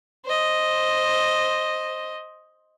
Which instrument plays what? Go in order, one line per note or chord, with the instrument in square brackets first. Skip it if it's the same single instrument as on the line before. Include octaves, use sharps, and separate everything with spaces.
[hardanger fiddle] C5 D#5